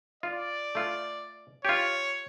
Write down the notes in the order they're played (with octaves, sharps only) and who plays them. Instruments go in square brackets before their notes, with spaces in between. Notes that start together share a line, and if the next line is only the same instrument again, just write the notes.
[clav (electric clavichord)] F4 [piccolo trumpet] D5
[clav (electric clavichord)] A3 F4
[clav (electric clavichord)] F4 G4 [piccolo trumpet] C#5